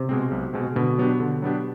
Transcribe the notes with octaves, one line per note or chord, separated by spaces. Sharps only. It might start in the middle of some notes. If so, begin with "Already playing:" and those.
Already playing: C3
B2 G#3 C4
B1
B2 G#3 C4
B2 D3
F#3 B3 D4 G4
D3
F#3 B3 D4 G4